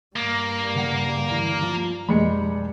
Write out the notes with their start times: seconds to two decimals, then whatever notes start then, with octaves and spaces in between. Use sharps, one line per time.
0.16 G2 G3 A#3
0.76 C#3 F#5
1.28 D2 E3
1.62 F3 F4
2.09 F1 B1 G3 G#3 G#4 B5 C#7